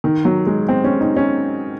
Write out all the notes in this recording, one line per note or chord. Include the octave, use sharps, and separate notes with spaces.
D#3
F#3
G#3
C4
C#4
D#4
C#4